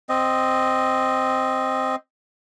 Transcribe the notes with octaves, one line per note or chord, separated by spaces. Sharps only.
C4 D#5